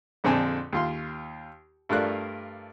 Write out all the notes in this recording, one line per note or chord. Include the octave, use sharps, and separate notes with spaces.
A#1 F2 D3 C4 G#5 A5
D#2 F4 C6
G2 A3 F4 A#4 D5 F#6